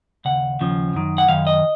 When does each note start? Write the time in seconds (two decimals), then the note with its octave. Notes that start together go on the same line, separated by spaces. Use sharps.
0.25 D#2 C#3 F#5
0.60 D#2 C#3 F3
0.94 F#2 D#3
1.18 F#5
1.29 F#2 D#3 F5
1.47 D#5